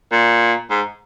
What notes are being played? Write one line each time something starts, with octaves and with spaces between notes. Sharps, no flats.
A#2
G#2